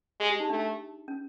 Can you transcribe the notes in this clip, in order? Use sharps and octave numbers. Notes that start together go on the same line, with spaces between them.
G#3 G#4
G4
D#4
A3 D4
C#4